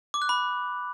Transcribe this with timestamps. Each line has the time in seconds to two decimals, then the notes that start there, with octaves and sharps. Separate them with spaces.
0.14 D6
0.22 F#6
0.29 B5